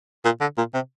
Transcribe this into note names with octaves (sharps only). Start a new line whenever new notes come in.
A#2
D3
A#2
C3